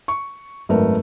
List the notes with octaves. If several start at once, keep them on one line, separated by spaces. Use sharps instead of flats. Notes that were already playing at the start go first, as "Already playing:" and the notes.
C#6
G#1 F#2 A3 A#4 B4